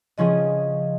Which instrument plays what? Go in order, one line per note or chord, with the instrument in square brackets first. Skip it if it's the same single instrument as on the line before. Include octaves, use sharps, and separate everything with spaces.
[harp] C#3 F3 C#4 F4 G#4 [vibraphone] D#5